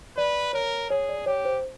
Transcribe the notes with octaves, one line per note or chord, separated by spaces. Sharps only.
B4 D5
A#4 C#5
G#4 C#5
D5
G4 C#5
C5